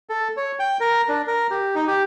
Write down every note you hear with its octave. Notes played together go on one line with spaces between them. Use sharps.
A4
C#5
G5
A#4
D4
A#4
G4
D#4
G4